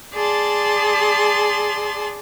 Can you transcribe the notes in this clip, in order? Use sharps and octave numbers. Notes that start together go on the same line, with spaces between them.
G#4 D5 A5 C6